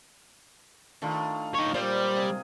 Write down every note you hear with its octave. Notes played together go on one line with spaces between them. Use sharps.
D#3 A3 D4 F4
D#4 C#5
A#2 G3 C5 D#5
C3 G#4